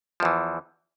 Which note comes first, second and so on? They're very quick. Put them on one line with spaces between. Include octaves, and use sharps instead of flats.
F3 E2 E3